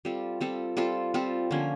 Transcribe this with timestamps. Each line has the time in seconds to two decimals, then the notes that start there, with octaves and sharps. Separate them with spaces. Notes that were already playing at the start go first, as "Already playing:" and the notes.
0.05 G3 C4 F4 A4
0.41 G3 C4 F4 A4
0.77 G3 C4 F4 A4
1.14 G3 C4 F4 A4
1.51 D3 F3 A#3 C#4